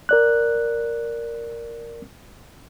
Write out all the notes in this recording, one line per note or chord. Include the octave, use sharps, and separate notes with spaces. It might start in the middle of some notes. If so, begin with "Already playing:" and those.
A#4 D5 F#6